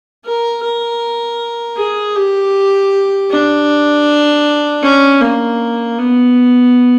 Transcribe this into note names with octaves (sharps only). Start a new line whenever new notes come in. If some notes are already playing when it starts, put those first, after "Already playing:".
A#4
A#4
G#4
G4
D4
C#4
A#3
B3